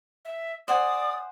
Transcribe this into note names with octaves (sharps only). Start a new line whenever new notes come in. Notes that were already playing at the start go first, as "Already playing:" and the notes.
E5
C5 D5 F#5 G#5 D#6